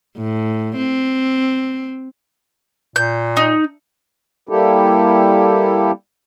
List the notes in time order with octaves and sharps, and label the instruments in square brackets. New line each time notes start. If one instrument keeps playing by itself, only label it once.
[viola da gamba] A2
C4
[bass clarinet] A#2 [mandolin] G6
[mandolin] D#4
[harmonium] G3 A#3 E4 G4 A4